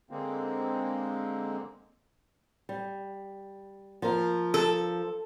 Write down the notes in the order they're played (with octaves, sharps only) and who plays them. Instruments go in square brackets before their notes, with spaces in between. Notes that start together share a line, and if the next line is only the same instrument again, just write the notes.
[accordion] D3 G#3 A#3 C4
[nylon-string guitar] G3
F3 A#3 A#4
[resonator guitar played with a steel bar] A4